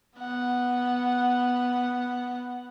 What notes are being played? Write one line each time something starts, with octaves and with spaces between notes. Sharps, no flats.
B3 F#5